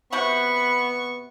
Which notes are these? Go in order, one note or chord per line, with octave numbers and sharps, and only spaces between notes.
C3 B3 F#4 B5 C#6